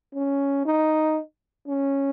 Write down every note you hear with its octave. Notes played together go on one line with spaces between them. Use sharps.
C#4
D#4
C#4